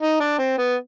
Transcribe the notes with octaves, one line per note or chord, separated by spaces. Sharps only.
D#4
D4
C4
B3